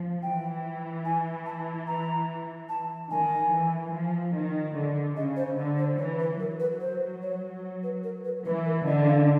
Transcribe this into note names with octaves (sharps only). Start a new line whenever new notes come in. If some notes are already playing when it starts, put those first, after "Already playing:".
Already playing: F3
E3 G5
G#5
A5
A#5
A5
D#3 G#5
E3
F3
D#3
D3
C#3 D#5
C5
D3
C5
E3 C#5
B4
F#3 A#4
B4
C5
C#5
B4
A#4
B4
E3 B4
A#4
D3 D#5
F5